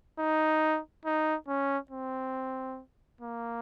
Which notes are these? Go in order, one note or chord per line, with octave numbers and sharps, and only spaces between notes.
D#4
D#4
C#4
C4
A#3